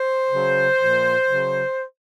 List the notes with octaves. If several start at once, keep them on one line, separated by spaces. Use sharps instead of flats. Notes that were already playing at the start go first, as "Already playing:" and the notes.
Already playing: C5
C#3 F#3
A#2 F3
C#3 F#3